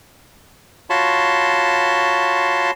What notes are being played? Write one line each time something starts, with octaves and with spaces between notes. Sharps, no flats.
F4 F#4 C#5 A5 B5 C6